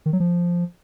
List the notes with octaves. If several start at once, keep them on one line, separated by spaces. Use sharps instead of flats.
D#3
F#3
F3